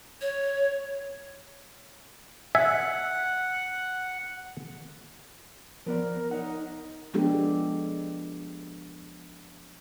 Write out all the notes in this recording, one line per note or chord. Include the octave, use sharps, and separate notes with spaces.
C#5
E5 F#5 G#5
F3 B3 A#4 D5
D#4 C#5 F#5
F3 G#3 B3 D4 G4 A4